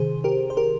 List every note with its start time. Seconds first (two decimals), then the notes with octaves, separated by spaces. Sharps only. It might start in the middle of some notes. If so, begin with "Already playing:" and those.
Already playing: C3 D#3 G#4 C5
0.24 G4 A#4
0.50 C5
0.57 G4 A#4